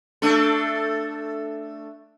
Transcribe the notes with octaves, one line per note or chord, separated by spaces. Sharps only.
A3 D4 A4